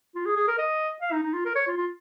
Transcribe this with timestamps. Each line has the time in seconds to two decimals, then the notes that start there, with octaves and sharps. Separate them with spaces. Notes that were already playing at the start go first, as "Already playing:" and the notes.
0.15 F4
0.26 G#4
0.36 G#4
0.48 A#4
0.58 D#5
1.02 F5
1.12 D#4
1.23 D#4
1.34 F4
1.45 A#4
1.56 C#5
1.67 F4
1.78 F4